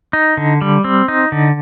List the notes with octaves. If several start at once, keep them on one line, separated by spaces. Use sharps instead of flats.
D#4
D3
G3
C4
D#4
D3